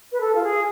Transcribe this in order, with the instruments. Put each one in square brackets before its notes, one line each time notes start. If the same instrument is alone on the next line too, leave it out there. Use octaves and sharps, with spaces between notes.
[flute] B4
A4
F4
G#4